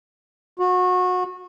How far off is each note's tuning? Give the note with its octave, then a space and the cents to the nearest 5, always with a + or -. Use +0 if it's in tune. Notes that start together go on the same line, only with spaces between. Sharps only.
F#4 -25